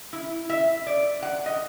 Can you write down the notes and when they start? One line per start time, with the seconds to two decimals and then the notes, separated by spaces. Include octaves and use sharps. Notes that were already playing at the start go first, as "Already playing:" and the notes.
0.13 E4
0.50 E5
0.87 D5
1.22 F#5
1.46 D#5